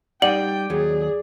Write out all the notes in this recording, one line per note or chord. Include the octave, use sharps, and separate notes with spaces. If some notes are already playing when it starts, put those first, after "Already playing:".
G3 D#4 G4 D5 F#5 G5 F#7
D#2 F#3 G#4